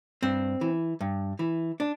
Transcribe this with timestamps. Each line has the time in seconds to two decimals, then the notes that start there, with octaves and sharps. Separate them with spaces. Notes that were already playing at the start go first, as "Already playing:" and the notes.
0.22 G2 C4
0.61 E3
1.01 G2
1.39 E3
1.80 D4